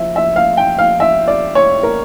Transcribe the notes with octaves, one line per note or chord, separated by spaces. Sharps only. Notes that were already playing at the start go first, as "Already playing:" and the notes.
Already playing: F3 E5
E5
F5
G5
F5
E5
D5
C#5
A#4